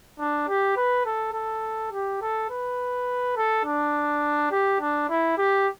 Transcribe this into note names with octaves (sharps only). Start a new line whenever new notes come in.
D4
G4
B4
A4
A4
G4
A4
B4
A4
D4
G4
D4
E4
G4